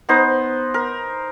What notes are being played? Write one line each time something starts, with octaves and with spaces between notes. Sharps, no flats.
B3 D#4 C5
A#4